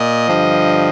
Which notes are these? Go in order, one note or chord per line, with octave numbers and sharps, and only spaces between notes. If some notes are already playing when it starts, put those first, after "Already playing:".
Already playing: A#2 D#5
G2 D3 F3